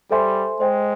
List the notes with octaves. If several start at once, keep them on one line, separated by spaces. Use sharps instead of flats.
G3 A4 C5 E5 G#5 C6
G#3 C5 D#5 G5